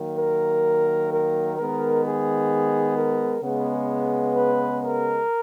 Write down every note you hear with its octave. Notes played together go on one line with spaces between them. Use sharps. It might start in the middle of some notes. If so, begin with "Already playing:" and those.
Already playing: D#3 F#3 A#3
A#4
A#4
D#3 G#3 B3 A#4
G#4
A#4
C#3 G#3 B3
B4
A#4